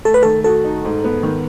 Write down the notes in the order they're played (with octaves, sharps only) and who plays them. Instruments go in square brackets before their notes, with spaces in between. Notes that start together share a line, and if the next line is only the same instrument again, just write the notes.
[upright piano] A3 [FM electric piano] A4
[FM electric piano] B4
[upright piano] D#3 [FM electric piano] A4
[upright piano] F#4 [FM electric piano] A4
[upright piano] D#4
G#2
B3
D#3